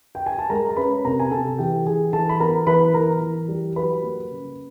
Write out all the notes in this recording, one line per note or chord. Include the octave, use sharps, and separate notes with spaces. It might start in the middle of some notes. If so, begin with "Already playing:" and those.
G5
G#5
A5
G#3 A#4 A#5
A#5
C#4 B4 B5
C3 A#4 A#5
G#5
C3 A4 A5
E3 G4 G5
E3 G#4 G#5
E3 A4 A5
B5
B3 A#4 A#5
E3 B4 B5
E3 A#4 A#5
E3
G3
F#3 B4 B5
A#3
C#3